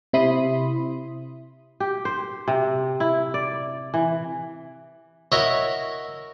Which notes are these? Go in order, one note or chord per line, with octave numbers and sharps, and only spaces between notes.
C3 E4 B5 C6 D#6
G4
C5
C3
E4
D5
E3
E4 F#4 A#4 C#5 D#5